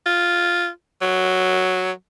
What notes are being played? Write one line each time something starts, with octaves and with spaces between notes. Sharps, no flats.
F4
F#3